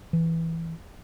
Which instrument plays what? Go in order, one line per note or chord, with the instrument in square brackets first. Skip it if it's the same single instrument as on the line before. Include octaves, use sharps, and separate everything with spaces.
[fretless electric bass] E3